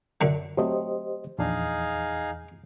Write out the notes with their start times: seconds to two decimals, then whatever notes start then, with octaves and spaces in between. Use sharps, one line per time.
0.21 F#2 D3
0.57 F#3 A3 C4 G4 C5 D#5
1.39 A#1 E2 D4 D#4 G#4 F5